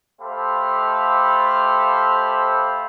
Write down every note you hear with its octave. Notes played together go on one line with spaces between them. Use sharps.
A3 G4 A4 C5 F5 B5